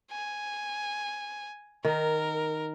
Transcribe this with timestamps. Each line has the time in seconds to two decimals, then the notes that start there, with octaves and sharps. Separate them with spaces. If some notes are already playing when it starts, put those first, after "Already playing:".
0.11 G#5
1.85 D#3 A#4